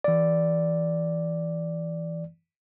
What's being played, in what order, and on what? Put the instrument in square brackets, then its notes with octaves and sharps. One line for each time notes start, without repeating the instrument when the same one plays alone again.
[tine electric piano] E3 D5